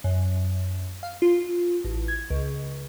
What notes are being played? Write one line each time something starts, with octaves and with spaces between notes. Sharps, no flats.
F#2
F5
F4
A1
G#6
C#2